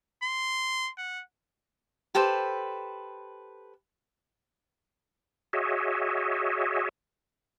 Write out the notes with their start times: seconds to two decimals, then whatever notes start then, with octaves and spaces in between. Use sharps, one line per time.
0.23 C6
0.98 F#5
2.15 G4 A4 B4 C5
5.53 F#4 G#4 C#5 D#5 E5